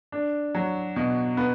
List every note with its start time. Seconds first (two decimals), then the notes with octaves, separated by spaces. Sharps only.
0.12 D4
0.55 F#3
0.96 B2
1.37 B3